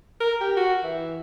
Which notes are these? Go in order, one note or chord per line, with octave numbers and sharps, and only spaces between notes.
A#4
G4
F#4
E3